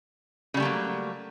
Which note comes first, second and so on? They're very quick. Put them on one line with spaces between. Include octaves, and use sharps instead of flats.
C#3 G3 A3 A#3 F#3